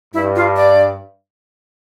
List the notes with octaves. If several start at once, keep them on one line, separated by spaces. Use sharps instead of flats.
G2 E4
F4
D5